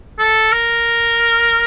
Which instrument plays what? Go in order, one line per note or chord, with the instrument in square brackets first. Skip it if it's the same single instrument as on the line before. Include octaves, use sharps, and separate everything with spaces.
[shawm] A4
A#4